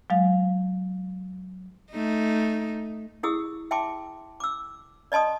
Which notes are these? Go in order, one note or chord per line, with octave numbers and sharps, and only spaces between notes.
F#3 G#3 F5
A3 D#4
E4 G4 G#4 D#6 E6
E5 G5 A5 C6 D6
D6 E6
D5 D#5 A5 C6 D#6